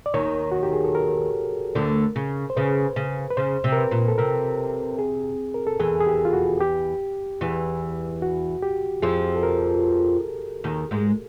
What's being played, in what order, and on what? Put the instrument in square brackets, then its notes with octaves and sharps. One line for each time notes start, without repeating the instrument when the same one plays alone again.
[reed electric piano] D5
[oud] D#2 D#3 [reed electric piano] C#5
[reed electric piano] F#4
G4
G#4
A4
A#4
[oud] D2 D3
C#3
[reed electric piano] C5
[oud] C#3 [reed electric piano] B4
[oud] C#3
[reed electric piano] B4
[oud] C#3 [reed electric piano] C5
[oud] C3
[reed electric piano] A#4
B4
[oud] A#2
[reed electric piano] A4
[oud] C3 [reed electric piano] A#4
[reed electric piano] G#4
A#4
A4
[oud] E2 E3 [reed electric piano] G#4
[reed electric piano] G#4
G4
F4
F#4
G4
[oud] E2 E3
[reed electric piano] F#4
G4
[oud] F2 F3 [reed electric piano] G#4
[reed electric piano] A4
A#4
[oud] D#2 D#3
G#2 G#3